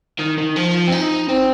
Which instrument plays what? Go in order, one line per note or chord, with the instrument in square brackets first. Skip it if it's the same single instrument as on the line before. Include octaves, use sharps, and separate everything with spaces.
[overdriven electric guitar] D#3
D#3
F3
C4
D#4
C4